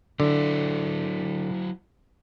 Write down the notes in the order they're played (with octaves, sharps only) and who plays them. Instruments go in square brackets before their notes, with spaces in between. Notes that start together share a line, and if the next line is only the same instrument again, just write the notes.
[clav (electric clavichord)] D3 [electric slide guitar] F#3 E4